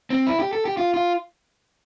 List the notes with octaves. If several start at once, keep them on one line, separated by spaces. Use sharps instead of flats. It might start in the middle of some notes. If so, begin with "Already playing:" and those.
C4
E4
G4
A4
G4
F4
F4